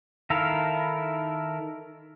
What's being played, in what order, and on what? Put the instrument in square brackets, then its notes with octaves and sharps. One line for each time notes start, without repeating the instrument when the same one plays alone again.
[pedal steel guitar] D#3 E4 A4 A#4 F5